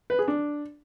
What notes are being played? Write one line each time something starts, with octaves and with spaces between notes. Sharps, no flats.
B4
G#4
D4